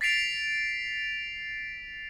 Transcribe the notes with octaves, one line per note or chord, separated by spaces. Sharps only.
A6 B6 C7 D7 F7